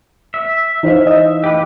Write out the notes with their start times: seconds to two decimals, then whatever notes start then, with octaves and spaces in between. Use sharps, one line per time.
0.34 E5
0.83 E3 D#4 C5 F5
1.07 D#5
1.44 G4 B4